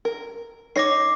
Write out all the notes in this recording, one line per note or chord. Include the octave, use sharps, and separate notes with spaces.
A#4
D#4 C#5 D6 A#6 C7